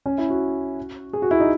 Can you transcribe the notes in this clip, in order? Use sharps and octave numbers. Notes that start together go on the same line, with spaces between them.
C#4
E4
F#4
G#4
F#4
E4
D#4